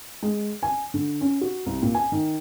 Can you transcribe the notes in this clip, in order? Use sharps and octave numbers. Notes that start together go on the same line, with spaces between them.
G#3
G#5
D3
C#4
F#4
C2
A#2
G#5
D#3